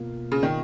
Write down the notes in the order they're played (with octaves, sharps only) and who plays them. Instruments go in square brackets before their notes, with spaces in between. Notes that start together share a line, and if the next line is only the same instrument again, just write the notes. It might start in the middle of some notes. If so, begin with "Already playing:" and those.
Already playing: [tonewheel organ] B2 A#3 F4
[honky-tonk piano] C#3
D#3